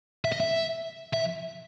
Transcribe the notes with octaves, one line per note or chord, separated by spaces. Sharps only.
E5
D#5
E5
E5